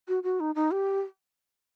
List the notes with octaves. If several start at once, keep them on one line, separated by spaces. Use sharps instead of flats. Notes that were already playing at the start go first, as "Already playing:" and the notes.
F#4
F#4
D#4
D#4
G4